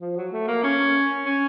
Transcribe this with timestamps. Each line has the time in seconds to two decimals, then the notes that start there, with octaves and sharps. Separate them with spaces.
0.01 F3
0.17 F#3
0.33 A3
0.48 A#3
0.64 C#4
1.25 C#4